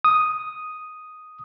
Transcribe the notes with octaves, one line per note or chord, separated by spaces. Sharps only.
D#6